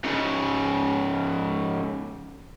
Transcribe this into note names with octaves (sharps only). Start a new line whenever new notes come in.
G#2 C#3